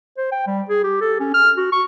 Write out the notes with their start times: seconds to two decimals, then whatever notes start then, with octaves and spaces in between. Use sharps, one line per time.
0.17 C5
0.32 G5
0.47 G3
0.69 G#4
0.84 G4
1.01 A4
1.20 C#4
1.34 F6
1.57 F#4
1.72 C#6